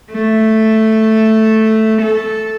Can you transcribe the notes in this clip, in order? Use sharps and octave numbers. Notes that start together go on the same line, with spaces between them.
A3
A4